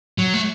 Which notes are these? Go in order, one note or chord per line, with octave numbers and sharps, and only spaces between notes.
F#3
A3